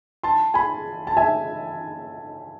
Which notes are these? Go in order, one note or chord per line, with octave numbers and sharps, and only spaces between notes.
A5 C6
G#5 B5
A5
E5 G#5